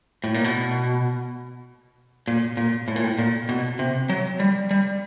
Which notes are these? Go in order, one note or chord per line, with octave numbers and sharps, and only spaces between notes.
A2
A#2
B2
A#2
A#2
A2
A#2
A2
A#2
B2
C3
F#3
G3
G3